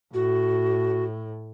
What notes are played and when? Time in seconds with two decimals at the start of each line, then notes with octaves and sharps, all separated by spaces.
0.14 A2 F#4